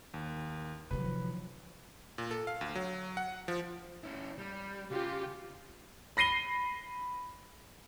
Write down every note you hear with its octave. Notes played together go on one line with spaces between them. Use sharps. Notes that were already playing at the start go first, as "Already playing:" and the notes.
D#2
C3 D#3 F3 F#3 B4
A#2
A4
F5
D2
F#3
F#5
F3
C#4 E4
G3
C#3 F4 G4
B5 A#6 C7 D#7 G7